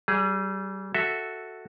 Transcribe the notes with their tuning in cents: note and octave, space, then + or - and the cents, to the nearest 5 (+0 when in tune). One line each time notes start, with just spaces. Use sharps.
G3 -30 G#4 +0
F#4 +0 A4 +5 E5 +0